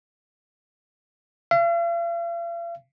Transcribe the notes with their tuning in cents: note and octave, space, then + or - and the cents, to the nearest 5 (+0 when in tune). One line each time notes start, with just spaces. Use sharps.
F5 -45